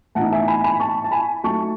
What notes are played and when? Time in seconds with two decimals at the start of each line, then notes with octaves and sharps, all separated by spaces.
0.15 A2 E3 B3 D#4 F#5 A5
0.32 E5 G#5
0.48 G#5 B5
0.64 G#5 B5
0.80 A5 C#6
1.04 A5
1.11 G#5 B5
1.43 F#3 A3 D#4 A5 C#6